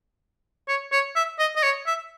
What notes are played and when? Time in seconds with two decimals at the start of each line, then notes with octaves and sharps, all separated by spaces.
0.68 C#5
0.92 C#5
1.16 E5
1.39 D#5
1.56 D#5
1.63 C#5
1.87 E5